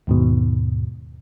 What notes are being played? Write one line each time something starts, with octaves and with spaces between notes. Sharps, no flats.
D#2 G#2 B2